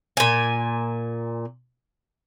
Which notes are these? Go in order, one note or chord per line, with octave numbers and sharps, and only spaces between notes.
A#2 G#5